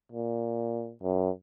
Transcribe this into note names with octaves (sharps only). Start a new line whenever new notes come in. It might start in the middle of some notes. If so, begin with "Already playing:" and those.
A#2
F#2